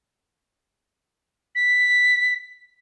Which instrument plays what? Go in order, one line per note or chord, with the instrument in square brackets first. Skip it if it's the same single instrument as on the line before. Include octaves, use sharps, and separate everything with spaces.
[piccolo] B6